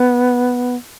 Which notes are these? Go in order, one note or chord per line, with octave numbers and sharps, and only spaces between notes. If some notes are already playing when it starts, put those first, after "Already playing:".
Already playing: B3